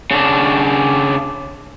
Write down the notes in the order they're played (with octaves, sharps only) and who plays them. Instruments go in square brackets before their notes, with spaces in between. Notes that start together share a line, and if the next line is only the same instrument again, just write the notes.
[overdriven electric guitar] C#3 D4